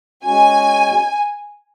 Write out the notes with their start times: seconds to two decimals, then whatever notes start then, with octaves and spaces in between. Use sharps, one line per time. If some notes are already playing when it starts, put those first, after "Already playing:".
0.24 G#3 C#4 F#4 G#5